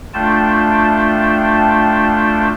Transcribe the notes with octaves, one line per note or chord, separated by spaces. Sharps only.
A3 D4 F4 G5 A5